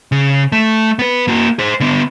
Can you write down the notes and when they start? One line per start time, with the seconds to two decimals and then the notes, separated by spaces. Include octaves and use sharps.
0.12 C#3
0.52 A3
0.99 B3 B4
1.28 A#3 F#4
1.59 G#4 C5
1.80 D3 B3